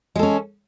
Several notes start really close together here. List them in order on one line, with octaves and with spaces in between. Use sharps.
G#3 A4 C#4